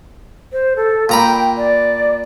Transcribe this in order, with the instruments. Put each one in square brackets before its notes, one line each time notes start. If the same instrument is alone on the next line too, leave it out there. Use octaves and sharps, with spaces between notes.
[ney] C5
A4
[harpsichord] A#2 A#5 B5 [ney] G5
[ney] D5